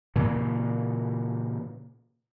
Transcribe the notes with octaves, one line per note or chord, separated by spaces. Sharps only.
A#2 C#3 E3